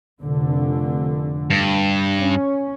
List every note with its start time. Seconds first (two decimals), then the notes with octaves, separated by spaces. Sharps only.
0.23 F1 D3
1.50 G2
2.19 C#4